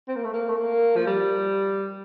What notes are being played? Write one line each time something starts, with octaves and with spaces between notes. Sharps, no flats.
C4
A#3
A3
A#3
A3
A#3
F3
G3